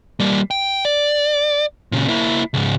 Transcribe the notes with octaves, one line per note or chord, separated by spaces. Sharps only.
G3 A#3
G5
D5
A#2 C#3
A#3 E4
C#2 G#2